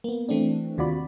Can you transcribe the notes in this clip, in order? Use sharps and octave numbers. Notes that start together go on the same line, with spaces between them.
A#3 B3
E3 A3 C4 D4
D#2 C3 F4 F#4 D5 B5